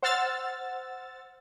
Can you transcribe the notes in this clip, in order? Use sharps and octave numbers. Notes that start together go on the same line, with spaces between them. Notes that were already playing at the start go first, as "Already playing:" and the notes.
C5 F#5 E6 F6 A6